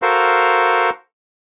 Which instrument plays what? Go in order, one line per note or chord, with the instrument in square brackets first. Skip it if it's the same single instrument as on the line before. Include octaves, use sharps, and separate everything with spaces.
[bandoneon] F#4 A4 A#4 C5 F5